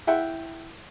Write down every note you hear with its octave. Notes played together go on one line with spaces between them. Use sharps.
E4 E5 F#5 G5